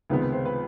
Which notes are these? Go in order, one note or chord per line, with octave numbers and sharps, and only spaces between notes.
C#2 C3 D#3 G#3 B3 B4
B4
C5
B4